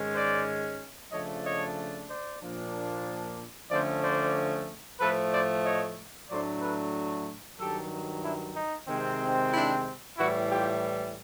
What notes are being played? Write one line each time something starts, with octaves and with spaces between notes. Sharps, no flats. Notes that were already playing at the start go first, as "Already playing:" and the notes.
Already playing: G#2 D#3 G#3 C#4
C5 D5
C#3 F3 A3 D4 C#5 D#5
C#5 D#5
C5 D5
A#2 F3 A#3 D4
D3 F3 A3 C#4 C5 D5
C5 D5
A2 F3 A3 A4 B4
C5 D5
C#5 D#5
A2 F#3 A3 D4 C5 D5
A4 B4
G2 D#3 F#3 G4 A4
D4 E4
D#4
C3 D#3 G#3 C4
D#4
D4 E4
A2 E3 G3 E4 F#4
F4 G4